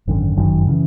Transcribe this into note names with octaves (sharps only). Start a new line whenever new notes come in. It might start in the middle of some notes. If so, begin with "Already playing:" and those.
G#1 F#2 D3
G1 F#2 D#3 F#3
C#3 E3